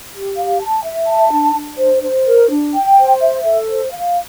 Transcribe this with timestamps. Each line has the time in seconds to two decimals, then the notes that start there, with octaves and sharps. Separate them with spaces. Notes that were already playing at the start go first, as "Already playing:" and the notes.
0.12 G4
0.35 F5
0.60 A5
0.82 E5
1.07 A5
1.30 D4
1.54 D4
1.77 C5
2.02 C5
2.25 A#4
2.50 D4
2.73 G5
2.98 C5
3.21 E5
3.45 A4
3.69 C5
3.91 F5